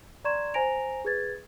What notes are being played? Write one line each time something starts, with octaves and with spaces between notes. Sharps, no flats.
D5 A#5 C6 C#6 G#6 E7
C5 G#5 A#5 A#6 D7 F7
G#4 B4 G#6 A6